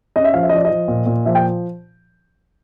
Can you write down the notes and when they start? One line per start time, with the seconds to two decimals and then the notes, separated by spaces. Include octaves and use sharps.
0.16 C#4 D#5
0.24 E5
0.34 F3 F5
0.43 E5
0.49 D#5
0.53 F3 D5
0.65 D#5
0.70 F3
0.88 A#2
1.06 A#2
1.26 F3 E5
1.35 G5